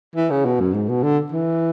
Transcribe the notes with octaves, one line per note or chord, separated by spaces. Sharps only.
E3
C#3
B2
F#2
G#2
B2
D3
E3